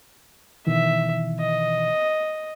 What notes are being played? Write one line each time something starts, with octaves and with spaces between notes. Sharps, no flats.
B2 D#3 E3 E5
D#5